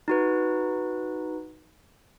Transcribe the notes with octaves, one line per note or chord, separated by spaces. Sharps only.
D#4 F#4 B4